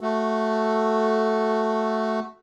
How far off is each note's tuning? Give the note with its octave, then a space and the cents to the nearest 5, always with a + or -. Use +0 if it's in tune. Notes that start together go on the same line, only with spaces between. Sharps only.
A3 +0 F#4 +0 A4 +0